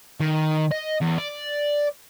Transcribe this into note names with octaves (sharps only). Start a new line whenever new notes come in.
D#3
D#5
E2
D5